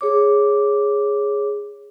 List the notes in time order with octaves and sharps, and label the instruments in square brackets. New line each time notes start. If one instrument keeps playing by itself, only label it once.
[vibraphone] G#4 C#5 D6